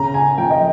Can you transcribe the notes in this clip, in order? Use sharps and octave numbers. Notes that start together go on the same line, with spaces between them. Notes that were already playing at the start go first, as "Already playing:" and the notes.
Already playing: C#3 A#5
G#5
F3 G5
D#5